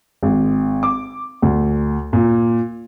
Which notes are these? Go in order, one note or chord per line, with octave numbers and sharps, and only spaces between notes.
G#1
D6
D2
A#2